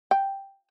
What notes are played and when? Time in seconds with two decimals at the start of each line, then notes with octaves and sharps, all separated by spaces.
0.11 G5